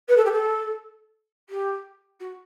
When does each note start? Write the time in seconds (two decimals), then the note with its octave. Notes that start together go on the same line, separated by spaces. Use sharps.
0.08 B4
0.16 A4
0.25 G4
0.32 A4
1.49 G4
2.20 F#4